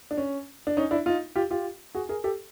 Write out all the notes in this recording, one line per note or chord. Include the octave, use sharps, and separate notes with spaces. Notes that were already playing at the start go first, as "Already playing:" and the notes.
D4
C#4
D4
C#4 D#4
D4 E4
D#4 F4
F4 G4
F4 G4
F#4 G#4
G#4 A#4
G4 A4